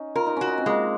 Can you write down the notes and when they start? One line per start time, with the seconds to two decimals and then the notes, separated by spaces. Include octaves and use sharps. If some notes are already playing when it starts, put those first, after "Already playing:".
Already playing: C#4 D#4
0.15 F4 A#4
0.26 D#4
0.37 C#4 F#4
0.47 D#4
0.58 C4
0.66 G#3 A#3